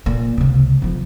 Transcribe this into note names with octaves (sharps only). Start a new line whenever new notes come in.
A#2
C#2 C3
B1 F3